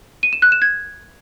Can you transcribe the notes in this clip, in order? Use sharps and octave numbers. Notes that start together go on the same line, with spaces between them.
D#7
E7
F#6
E7
G#6